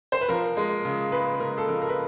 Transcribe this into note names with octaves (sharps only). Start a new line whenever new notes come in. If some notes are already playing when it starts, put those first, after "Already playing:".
C5
B4
F3 A#4
G#3
C#3
G#3 B4
C#3 A#4
A4
F3 A#4
A#4
B4